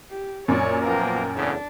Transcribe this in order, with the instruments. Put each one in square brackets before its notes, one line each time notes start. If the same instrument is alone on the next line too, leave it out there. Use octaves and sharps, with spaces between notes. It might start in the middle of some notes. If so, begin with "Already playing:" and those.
[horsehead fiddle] G4
[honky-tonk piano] F#2 A#2 [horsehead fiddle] C#5 D5
[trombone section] F3 A#3 B3 [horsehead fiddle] A#4 G5
[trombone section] E2 A2 C#3 [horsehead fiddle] D4